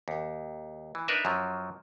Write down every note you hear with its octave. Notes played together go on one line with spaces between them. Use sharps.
D#2
E3
D4 D#4 A#4 B4 E5
F#2 F3 F#3